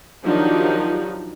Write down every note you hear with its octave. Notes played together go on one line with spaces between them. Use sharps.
D#3 F3 F#3 D4 D#4 G4